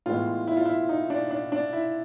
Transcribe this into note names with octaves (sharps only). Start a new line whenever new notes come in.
A2 E3 G#3 B3 F4
E4
F4
E4
D#4
D4
D4
D4
E4